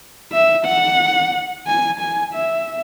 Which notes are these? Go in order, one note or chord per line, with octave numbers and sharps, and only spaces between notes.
E5
F#5
G#5
G#5
E5